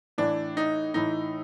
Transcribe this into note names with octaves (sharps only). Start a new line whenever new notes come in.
A2 E3 D4
D#4
A2 E3 D#4